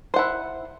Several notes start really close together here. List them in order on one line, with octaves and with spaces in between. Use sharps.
C5 F#5 E4